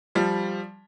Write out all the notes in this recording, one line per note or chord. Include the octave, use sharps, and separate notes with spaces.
F3 G3